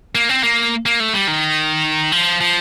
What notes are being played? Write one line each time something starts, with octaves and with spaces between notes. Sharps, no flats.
A#3
C4
A#3
A#3
A3
G3
D#3
F3
F3